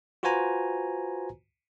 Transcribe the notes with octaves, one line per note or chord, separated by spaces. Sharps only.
F4 F#4 B4 C5 G#5 A#5